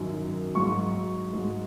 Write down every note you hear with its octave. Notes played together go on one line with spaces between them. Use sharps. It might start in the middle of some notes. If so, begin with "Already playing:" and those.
Already playing: F#2 D#3 F#3
G#2 F#3 C#6
G#2 F#3